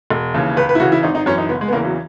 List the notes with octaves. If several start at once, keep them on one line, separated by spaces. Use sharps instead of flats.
E1
D#2 C#3 E3
C#2 B4
B4
E4
C#3 E3 F#4
E4
G#1 D#4
D#4
F#2 E3 C#4
D#4
F#1 B3
G#3
B3
E2 C#3 E3 A#3
F#3